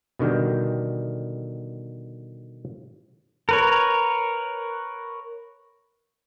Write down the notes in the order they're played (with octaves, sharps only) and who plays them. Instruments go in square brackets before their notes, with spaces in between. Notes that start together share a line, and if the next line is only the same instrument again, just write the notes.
[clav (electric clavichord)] B2 D3 D#3 G3 G5
[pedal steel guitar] A#4 B4 C#5